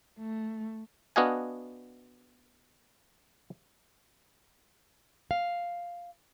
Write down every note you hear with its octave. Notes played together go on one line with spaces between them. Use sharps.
A3
B3 D4 F#4 D#5 F5 G#5
F5